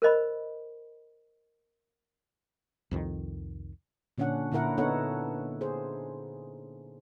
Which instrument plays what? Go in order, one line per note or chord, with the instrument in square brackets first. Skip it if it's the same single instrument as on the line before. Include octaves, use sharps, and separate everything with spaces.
[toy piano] A#4 C5 D#5 B5
[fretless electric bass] C2 F2 D#3
[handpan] A#2 D3 C#4 D4 F#5
A#2 D3 E4 A#4 F#5
B3 D4 D#4 A4 C#5 F#5
G#4 C5